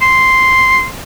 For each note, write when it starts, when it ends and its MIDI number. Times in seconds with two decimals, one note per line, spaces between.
0.02 0.86 84